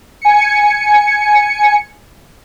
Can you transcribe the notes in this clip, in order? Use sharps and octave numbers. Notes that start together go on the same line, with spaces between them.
G#5 C#7